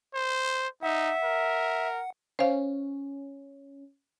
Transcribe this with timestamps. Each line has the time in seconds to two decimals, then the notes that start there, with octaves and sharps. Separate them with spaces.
0.14 C5
0.83 D#4 E5 F#5
1.24 A#4
2.39 C#4 C5 F5